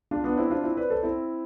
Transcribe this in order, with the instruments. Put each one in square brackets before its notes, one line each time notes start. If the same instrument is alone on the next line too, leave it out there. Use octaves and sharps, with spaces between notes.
[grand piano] D4 F4
B3 D4
C4 E4
D4 F4
C4 E4
B4 D5
A4 C5
C4 E4